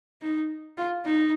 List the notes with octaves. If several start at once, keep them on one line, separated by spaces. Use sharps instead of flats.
D#4
F4
D#4